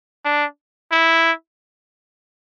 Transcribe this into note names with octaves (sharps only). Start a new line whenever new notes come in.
D4
E4